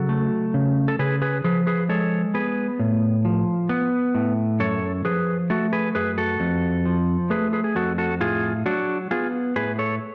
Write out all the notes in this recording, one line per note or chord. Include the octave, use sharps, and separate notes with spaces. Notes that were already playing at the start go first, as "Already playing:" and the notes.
Already playing: C#3 F#3 F#4 A4
A3
C#3
A4
C#3 G#4 B4
G#4 B4
F3 G#4 B4
G#4 B4
G#3 A4 C#5
B3 G#4 B4
A2
F3
B3
A2
F#2 A4 C#5
F3 G#4 B4
A3 F#4 A4
G#4 B4
F#2 G#4 B4
F#4 A4
F2
F3
A3 G#4 B4
G#4 B4
G#4
F2 F#4 A4
F#4 A4
A2 F4 G#4
F#3 D4 F#4
B3 F4 G#4
A2 G#4 B4
A4 C#5